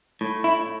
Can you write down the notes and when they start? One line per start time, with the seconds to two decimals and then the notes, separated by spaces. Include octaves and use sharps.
0.21 A2
0.44 E4